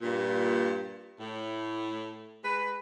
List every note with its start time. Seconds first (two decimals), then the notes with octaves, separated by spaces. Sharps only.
0.02 G2 A#2
1.19 A2
2.43 G#3 B4